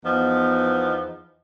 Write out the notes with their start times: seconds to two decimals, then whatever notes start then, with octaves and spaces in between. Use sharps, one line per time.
0.05 E2 F3 B3 D#4